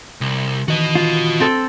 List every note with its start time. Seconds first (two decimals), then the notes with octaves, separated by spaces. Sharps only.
0.21 C2
0.68 D#3 E3 F#4 D#5
0.95 F4
1.40 C4 A4